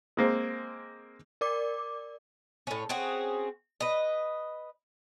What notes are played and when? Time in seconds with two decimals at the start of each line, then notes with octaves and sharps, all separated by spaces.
0.17 G#3 A#3 C4
1.41 A#4 D5 D6
2.67 A2 C#4
2.89 C4 C#4 F#4 G#4
3.80 B4 D#5